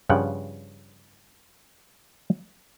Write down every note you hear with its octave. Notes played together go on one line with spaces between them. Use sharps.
G2 C#3 F3 F#5 G5